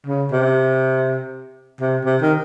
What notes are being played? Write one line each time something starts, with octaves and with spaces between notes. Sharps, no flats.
C#3
C3
C3
C3
D#3